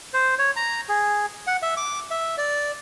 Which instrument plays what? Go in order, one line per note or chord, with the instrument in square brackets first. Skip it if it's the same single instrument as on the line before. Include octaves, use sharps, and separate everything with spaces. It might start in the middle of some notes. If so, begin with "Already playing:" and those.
[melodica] C5
C#5
A#5
G#4
F#5
E5
D6
E5
D5